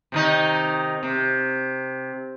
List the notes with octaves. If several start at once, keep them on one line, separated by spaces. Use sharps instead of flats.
C3 D#3 D#4
C3